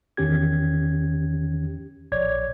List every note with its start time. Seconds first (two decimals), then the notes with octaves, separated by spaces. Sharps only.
0.17 E2 D#3 C#4 G4 G#6
2.12 A#1 C#5 D5 G#6